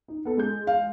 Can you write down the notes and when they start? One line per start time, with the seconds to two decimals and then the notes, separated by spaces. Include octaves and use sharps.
0.08 D#4
0.25 B3 A4
0.37 G#3 G6
0.67 F5